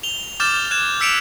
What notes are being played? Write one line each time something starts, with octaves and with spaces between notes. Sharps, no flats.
F7 G7
D6 F6 G6 A6 E7
F#6 G#6 E7
E6 B6 C#7 D7 E7 F7